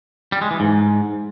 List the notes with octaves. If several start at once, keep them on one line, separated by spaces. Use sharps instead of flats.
G3
G#3
E3
G#2